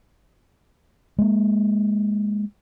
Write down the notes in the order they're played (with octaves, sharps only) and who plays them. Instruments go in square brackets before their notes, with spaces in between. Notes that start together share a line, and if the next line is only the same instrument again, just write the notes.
[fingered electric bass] G#3 A#3